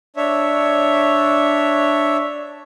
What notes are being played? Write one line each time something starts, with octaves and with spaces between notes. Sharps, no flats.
D4 C#5 E5